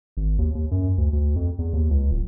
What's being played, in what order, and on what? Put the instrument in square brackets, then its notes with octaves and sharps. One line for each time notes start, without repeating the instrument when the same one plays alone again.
[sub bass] G#1
D#2
D#2
F#2
D2
D2
F2
E2
D#2
C#2
D1